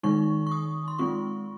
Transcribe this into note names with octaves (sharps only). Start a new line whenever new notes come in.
D#3 G#3 D#4 C#6
C#6
D#6
C6
G#3 C4 F4 C#6